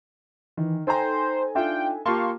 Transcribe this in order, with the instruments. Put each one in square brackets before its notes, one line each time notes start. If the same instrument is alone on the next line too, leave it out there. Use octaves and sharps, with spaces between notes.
[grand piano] D#3 [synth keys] E3
[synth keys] D#4 A4 G#5 [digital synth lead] C5 [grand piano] G5 A#5
[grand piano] D4 F4 E5 [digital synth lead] G5
[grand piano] A#3 F4 G4 [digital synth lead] F5 [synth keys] A5 C6 C#6